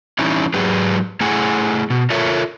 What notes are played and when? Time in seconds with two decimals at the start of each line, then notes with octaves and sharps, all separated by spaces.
0.19 E3 G3 C#4 D#4 E4
0.54 G#2 F#3 G4 G#4 B4
1.21 A3 E4 G#4 F#5 G#5
1.90 B2
2.10 F4 A4 A#4 C#5 E5